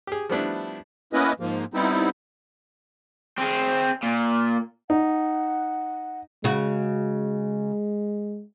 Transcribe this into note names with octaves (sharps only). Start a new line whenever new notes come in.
G4 G#4
F3 G3 A3 B3 D4 E4
A#3 B3 C#4 E4 B4 D#5
G#2 F3 A#3
G3 B3 C4 D#4 E4
C4 G#4
A#2
D#4 F#5
C#3 G#3 F#4